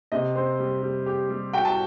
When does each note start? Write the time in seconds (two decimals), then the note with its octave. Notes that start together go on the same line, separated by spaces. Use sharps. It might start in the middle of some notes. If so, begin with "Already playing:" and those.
0.12 C3 D#5
0.35 C4
0.59 G3
0.82 G3
1.06 G4
1.30 G3
1.53 F#4 G5
1.65 A5